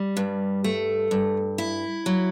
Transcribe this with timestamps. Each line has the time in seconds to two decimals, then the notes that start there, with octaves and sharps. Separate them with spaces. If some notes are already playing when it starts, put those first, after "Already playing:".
Already playing: G3
0.17 G2
0.64 A3
1.11 G2
1.58 E4
2.06 F#3